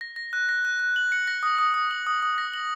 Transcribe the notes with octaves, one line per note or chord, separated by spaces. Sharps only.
A#6
A#6
F#6
A#6
F#6
F#6
F#7
C#7
A#6
D#6
D#6
D#6
F#7
D#6
D#6
A#6
F#7